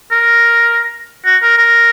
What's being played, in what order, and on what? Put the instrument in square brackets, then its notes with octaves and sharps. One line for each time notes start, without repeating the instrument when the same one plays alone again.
[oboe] A#4
F#4
A#4
A#4